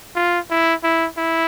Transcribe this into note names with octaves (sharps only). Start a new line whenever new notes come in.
F4
E4
E4
E4